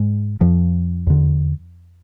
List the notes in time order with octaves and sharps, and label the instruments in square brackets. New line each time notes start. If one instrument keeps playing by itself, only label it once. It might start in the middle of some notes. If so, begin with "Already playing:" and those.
Already playing: [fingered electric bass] G#2 G#3
F2 F3
E2 D3